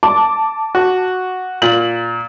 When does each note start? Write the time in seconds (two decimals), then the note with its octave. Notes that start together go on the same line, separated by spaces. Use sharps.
0.03 A5 D6
0.75 F#4
1.62 A#2 F#7